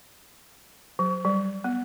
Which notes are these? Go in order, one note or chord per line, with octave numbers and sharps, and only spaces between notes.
F#3
G3
B3